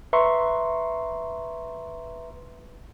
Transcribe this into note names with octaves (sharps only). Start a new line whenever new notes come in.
B4 E5 A#5 C6 C#6